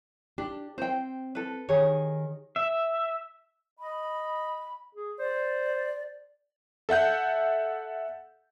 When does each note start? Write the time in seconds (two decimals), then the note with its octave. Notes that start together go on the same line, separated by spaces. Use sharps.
0.38 D4 G4
0.78 C4 C5 G5
1.35 A4 B4
1.69 D#3 G4 G#4 C#5
2.56 E5
3.79 D#5 B5
4.95 G#4
5.19 C5 D5
6.89 A4 E5 F#5 G6